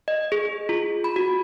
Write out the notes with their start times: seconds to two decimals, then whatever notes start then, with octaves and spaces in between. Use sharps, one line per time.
0.08 D#5
0.32 G#4
0.69 F4
1.04 B5
1.16 F#4